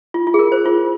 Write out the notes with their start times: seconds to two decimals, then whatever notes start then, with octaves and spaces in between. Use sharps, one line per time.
0.14 F4
0.27 F4
0.34 G#4
0.39 A#4
0.52 C5
0.65 F4